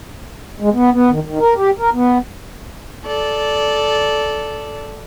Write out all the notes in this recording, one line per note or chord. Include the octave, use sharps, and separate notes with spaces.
G#3
B3
B3
D#3
D#3
A#4
G4
A#4
B3
A4 D5